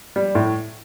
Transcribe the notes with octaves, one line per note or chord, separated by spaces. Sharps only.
G3
A2